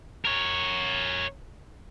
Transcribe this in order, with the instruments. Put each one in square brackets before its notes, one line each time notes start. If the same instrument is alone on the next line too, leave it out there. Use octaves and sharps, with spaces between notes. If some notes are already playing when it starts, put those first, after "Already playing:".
[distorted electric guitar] A#4 C#5